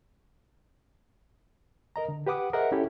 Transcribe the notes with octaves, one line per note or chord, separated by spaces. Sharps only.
A#4 D#5 A#5
D3
G4 B4 F#5 D6 D#6
G#4 A#4 C5 D#5 E5 F#5
C#4 E4 G4 A4